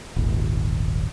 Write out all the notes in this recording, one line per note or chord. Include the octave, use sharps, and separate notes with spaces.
D#1 G#1